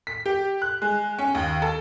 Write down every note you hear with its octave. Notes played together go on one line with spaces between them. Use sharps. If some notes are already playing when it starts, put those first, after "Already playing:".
B6
G4
F#6
G#3
C#4
D#2
A4